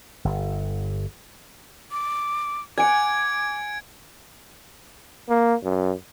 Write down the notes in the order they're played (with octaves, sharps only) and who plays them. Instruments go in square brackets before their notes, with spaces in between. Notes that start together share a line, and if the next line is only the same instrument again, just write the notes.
[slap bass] G1
[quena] D6
[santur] F#5 G#5 [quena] D6 [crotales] G#6 D7
[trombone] A#3
F#2